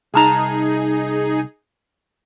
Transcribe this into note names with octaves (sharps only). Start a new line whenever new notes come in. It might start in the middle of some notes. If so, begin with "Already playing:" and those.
C2 D#4 G#4 A5 A#5